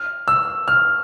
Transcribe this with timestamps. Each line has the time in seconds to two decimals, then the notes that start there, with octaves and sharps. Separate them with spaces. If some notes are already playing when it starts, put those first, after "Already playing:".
Already playing: F6
0.28 E6
0.68 F6